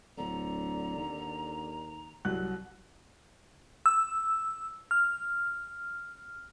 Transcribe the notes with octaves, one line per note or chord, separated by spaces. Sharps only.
D1 D3 A#5
D#2
C2 F#3 F#6
E6
F6